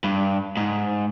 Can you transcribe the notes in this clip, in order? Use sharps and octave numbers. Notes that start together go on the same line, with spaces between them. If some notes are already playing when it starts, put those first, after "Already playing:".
G2
G#2